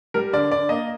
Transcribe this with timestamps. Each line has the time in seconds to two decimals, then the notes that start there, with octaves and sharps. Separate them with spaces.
0.14 G3 A#4
0.33 D3 D5
0.51 D3 D5
0.69 A#3 D#5